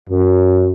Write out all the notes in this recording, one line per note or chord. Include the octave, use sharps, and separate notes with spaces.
F#2